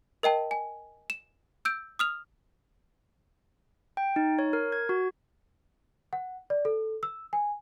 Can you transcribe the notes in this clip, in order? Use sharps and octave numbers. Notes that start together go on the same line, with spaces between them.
A#4 D#5 G5 A5
G#5
E7
E6 G6 D7
D#6 F6 F7
G5
D#4
C#5
A#4
G#6
F#4
F#5
D5
A4
E6
G#5